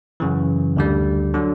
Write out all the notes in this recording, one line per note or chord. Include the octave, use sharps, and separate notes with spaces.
F#2 C#3 E3
D2 D3 G3
D3 F#3